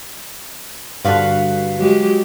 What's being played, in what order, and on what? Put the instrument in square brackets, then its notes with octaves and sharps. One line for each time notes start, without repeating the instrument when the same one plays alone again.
[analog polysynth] G2 D3 [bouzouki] F#4 B4 F5
[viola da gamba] F#3 G#3 G4